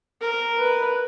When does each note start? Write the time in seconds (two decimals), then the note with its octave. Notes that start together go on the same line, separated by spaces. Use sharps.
0.21 A#4
0.59 B4